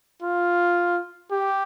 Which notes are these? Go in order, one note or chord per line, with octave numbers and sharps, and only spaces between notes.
F4
G4